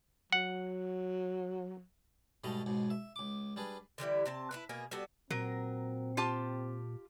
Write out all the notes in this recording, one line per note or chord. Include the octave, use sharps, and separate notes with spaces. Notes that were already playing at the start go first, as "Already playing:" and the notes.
F#3 F#5
G#2 B2 G3 A3 D#5 A#5
C#2 G#2 B2
E5
C#2 D6
G3 D4 G#4 B4
D3 E3 G3 E4
C3 C4 A5
E4 F4 B4
B2 A#3 G#4
G3 B3 F#4 A4
A#2 F#3 C4 A#4
F4 G4 A5